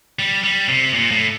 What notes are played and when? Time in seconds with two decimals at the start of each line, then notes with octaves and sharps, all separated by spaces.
0.19 G3
0.44 G3
0.68 C3
0.93 A#2
1.11 A2